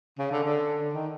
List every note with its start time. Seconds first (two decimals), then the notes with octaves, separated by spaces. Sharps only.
0.18 C#3
0.31 D3
0.43 D3
0.93 D#3